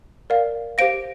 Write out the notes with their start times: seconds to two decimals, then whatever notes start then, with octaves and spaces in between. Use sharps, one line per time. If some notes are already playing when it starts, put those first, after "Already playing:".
0.30 A#4 D5 F5
0.78 G4 C5 F5 A#6 D7